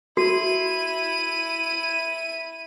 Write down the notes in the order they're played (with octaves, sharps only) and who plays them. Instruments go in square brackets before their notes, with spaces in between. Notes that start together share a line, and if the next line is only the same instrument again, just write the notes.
[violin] E4 D#7 [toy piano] F#4